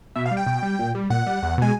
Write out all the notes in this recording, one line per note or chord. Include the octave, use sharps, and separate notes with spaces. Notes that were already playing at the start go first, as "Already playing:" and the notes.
B2 E5
F5
G3
G5
B2
G3
A#2
G3
A#2 F#5
G3
E2
B2 G#3 G#5